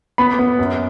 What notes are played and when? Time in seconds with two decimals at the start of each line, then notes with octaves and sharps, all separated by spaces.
0.18 B3 B5
0.39 B3
0.59 F#2